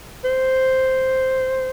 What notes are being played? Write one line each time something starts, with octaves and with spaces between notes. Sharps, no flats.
C5